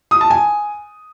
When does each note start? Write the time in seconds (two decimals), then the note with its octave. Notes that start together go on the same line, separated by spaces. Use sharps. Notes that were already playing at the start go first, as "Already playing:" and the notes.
0.11 D#6
0.21 A5
0.30 G#5